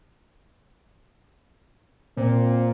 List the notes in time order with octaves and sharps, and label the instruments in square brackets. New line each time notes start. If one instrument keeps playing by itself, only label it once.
[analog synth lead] A#2 [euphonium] C4